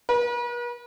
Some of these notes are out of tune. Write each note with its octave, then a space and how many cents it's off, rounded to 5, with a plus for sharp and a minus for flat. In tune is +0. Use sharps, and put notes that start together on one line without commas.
B4 -45